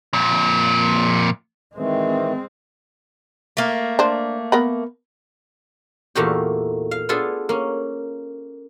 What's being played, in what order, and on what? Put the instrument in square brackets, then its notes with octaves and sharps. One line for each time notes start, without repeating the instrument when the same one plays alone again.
[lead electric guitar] F2 A#2
[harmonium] D#3 E3 [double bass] G#3 C4
[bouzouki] A3 A#3
[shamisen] D4 C5
B3 A#4 B5
[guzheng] E2 A#2 A3 A#3 F#4 G4
F5
B3 D4 F4 G#4 A4
A#3 C#4